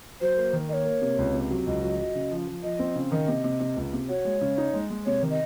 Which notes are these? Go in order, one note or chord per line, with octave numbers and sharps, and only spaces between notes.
F#3 C5
A#3
D#3
A#3 C#5 D#5
A#3
C3
C#2
C3
F#3
C#2 D#5
F#3
F#3
C#3
F3
F3
F3 D#5
C4
C#3
D#3 D#5
C3
C3
C3
C#2
C3
F#4 C#5
G#3
C#3
D#4
G#3
G#3
C3 C#5
D#3
D#5